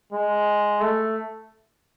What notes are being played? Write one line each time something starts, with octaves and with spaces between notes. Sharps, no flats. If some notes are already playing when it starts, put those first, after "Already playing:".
G#3
A3